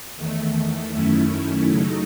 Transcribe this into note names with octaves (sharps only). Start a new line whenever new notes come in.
E2 D#3 A3
F#2 D#3 A3 C#4 E4
C#3 F#3 A3 D#4